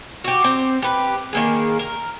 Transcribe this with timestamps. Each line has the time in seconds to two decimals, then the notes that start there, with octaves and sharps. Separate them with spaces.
0.24 F#4 G4
0.44 C4
0.82 G4 B4
1.33 D#3 A#3 G#4
1.79 A#4